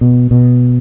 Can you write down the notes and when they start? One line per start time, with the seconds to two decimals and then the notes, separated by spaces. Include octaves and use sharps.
0.01 B2
0.31 B2